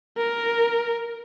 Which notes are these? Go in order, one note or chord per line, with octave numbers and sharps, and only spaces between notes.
A#4